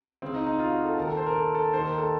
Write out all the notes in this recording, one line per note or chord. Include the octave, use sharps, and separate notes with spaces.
C#2 C#3 C4
D#4
D#4
F4
F#4
A4
D#2 D#3 A#4
A4
C5
A#4
A4
A4
D#2 D#3 C5
A#4
A4